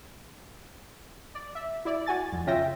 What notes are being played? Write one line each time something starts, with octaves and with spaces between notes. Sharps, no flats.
D5
E5
E4 D5
F#4 G#5 A6
F2
C#3 C#4 F4 E5 G5 A#6